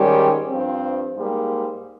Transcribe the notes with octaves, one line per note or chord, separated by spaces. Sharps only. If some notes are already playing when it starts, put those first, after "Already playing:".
Already playing: G#2 D#3 G3 C#4 G4
G2 F3 C4
G#2 G3 A#3